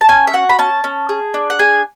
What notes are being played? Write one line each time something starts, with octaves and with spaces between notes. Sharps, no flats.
A5
C#4 G#5
E5
F#4 F#5
B5
C#4 A5
C#4
G#4
D4
F#5
G#4 G#5